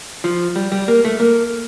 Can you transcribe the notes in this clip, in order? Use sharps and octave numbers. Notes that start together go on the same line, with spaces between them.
F3
G3
G3
A#3
A3
A#3